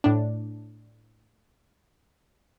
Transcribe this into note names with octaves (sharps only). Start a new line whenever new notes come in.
A2 D4